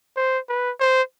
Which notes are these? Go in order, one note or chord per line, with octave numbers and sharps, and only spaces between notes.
C5
B4
C5